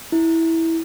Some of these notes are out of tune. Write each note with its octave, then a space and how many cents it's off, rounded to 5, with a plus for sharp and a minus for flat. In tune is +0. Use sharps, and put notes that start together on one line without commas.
E4 -10